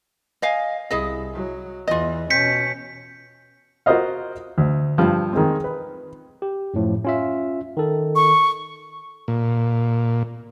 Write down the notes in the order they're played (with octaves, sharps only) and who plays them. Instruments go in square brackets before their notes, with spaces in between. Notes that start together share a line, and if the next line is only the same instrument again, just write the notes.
[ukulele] D#5 F5 G#5
[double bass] C2 [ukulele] E4 G#4 D#5
[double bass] F#3
[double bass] E2 E3 [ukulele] F4 D#5
[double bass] B2 C#4 [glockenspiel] G6 B6 C#7
[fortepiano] F4 F#4 A#4 C5 D#5 F5
D2
G2 F3
D#3 G#3 C4
B4
[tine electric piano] G4
F#2 A2 F3
C#4 F4 E5
D#3 A4
[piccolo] C#6
[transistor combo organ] A#2